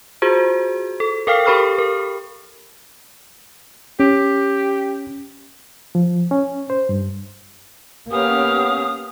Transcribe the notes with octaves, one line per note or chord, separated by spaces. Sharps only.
F4 F#4 G#4 C5
A4
A4 A#4 F5 G5 F6 C7
G4 A4 A#4 B5 C#6 F6
A#4
C#4 G4
F3
C#4
C5
G2
A#3 B3 C#4 G4 F5 D#6